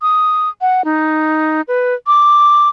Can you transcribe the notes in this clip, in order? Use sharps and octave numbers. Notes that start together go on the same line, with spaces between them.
D#6
F#5
D#4
B4
D6